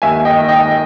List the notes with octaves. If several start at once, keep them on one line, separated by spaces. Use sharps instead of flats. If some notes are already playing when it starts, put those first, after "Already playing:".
D#2 E5 G#5
D#5 G5
D#3
D#5 G5